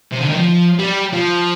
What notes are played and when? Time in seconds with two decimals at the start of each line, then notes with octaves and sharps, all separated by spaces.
0.12 C3
0.20 D3
0.29 D#3
0.37 F3
0.79 G3
1.13 F3